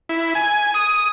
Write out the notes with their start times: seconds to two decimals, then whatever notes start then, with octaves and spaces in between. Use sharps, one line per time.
0.09 E4
0.35 G#5
0.74 D#6